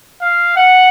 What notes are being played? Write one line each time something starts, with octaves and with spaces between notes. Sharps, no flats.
F5
F#5